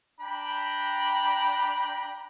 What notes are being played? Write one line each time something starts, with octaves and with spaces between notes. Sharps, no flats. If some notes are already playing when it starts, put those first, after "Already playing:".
D4 G5 A#5 B5